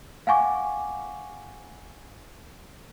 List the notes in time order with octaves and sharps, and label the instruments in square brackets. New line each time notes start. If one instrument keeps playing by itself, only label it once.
[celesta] F5 F#5 G#5 C#6 D6